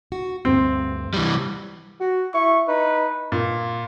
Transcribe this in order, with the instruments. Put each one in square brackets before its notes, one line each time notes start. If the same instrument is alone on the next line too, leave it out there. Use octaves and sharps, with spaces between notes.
[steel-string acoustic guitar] F#4
[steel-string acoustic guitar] D2 G2 [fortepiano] C4
[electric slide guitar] E3 G3
[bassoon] F#4
[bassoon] E4 [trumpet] C#6
[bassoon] D#4 [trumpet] B4
[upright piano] A#2